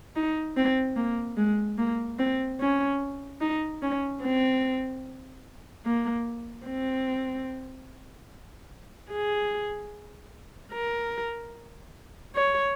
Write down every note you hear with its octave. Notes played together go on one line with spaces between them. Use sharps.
D#4
C4
A#3
G#3
A#3
C4
C#4
D#4
C#4
C4
A#3
C4
G#4
A#4
C#5